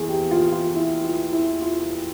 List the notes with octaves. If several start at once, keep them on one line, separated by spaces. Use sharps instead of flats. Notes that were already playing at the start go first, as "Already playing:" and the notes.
Already playing: E2 G#4
G4
F4
F4
E4
F4
E4
F4